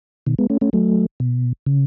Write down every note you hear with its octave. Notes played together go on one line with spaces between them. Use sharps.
B2 D#3
G#3 B3
A3 C#4
A3 C#4
F#3 A3
B2
C#3